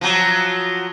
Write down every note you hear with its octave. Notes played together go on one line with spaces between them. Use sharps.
F3 F#3